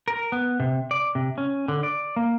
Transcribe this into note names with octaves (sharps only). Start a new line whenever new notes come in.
A#4
B3
C3
D5
C3
C#4
D3
D5
A#3